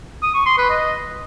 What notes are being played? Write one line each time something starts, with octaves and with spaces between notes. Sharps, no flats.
D#6
C#6
C6
B4
D#5